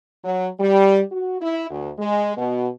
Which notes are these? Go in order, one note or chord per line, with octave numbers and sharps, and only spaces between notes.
F#3
G3
F#4
E4
D2
G#3
B2